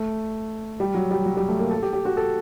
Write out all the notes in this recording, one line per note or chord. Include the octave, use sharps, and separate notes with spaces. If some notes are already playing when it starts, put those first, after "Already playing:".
Already playing: A3
G3
F#3
G3
F#3
G3
A3
A#3
A4
G4
G4
F#4
A4